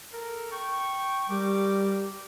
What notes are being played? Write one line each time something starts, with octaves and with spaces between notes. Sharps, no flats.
A4 A#4
G5 C#6
G3 G4 A#4 D6